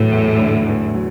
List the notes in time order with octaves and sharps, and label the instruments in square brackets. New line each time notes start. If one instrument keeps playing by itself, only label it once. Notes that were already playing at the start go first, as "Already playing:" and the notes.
Already playing: [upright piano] E2 D3 F#3 [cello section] A2
[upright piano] E2
D3
E2
F#3